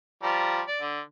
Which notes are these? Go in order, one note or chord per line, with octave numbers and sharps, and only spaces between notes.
F3 G3 A#5
D5
D3